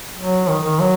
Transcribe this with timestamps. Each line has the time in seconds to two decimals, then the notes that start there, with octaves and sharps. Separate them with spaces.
0.18 F#3
0.49 D#3
0.64 D#3
0.80 F#3